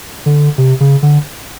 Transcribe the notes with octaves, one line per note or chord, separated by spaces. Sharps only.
D3
C3
C#3
D3